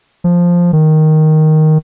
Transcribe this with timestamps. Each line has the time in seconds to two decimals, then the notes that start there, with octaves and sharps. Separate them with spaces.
0.24 F3
0.73 D#3